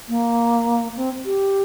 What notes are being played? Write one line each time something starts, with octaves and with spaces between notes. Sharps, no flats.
A#3
C4
G4